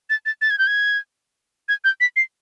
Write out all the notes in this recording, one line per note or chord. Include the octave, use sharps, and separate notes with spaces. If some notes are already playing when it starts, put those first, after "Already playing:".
A6
A6
A6
G#6
G6
G#6
G#6
G6
B6
C7